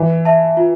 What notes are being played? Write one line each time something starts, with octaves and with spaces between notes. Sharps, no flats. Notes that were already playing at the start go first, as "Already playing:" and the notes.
Already playing: E3
E5 A5
F4